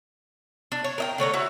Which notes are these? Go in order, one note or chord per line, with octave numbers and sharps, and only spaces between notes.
D4
C#5
A#4 D#5 G5
D3 A3 C#5 A#5
E4 F#4